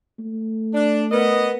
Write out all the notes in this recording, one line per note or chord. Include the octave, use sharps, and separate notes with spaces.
A3
D4
B3 A#4 B4 D#5